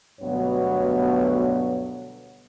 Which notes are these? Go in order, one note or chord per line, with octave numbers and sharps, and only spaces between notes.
D2 G2 B2 F#3 B3 C#5